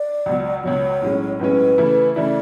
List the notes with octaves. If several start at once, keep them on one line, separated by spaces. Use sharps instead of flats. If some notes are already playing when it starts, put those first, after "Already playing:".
Already playing: D5
C#2 B2 F#3
C#2 B2 F#3 C#5
B1 A2 G#3 C#4
B1 A2 G#3 C#4 B4
C#3 E3 A3 E4
C#3 E3 A3 E4 D5